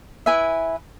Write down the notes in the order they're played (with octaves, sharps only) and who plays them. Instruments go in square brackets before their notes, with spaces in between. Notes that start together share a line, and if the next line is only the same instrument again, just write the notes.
[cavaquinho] E4 B4 E5 G#5